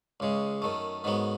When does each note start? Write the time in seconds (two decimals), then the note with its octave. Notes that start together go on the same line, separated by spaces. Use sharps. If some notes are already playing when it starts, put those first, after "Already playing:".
0.20 C#2 C#3 G#3
0.62 F#2 D#3 A3
1.04 G#2 D#3 F#3 B3